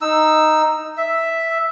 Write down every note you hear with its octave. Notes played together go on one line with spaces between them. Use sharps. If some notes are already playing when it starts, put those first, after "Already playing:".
D#4 E6
E5